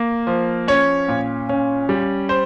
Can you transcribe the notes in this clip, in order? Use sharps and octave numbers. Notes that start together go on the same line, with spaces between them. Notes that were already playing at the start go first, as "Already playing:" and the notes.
Already playing: A#3
F3
C#4 C#5
A#2
C#4
G3
C5